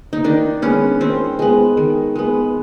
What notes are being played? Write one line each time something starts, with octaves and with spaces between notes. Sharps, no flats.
D#4
D#3 D4
G#3 B3 C#4
D#3 C4
G#3 B3
D#3
G#3 B3